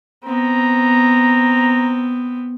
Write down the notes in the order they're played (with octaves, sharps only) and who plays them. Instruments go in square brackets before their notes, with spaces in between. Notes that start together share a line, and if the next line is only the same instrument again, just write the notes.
[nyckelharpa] B3 C4 [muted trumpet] A#5